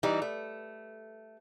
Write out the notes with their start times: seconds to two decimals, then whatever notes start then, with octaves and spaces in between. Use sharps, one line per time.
0.03 E3 G3 D#4
0.22 A3